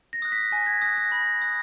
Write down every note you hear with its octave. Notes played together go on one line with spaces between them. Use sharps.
A#6
D#6 F#6
B6
G#5 A#6
G#6
D#6 F#6 A#6
A#6
B5 A#6
D#6 F#6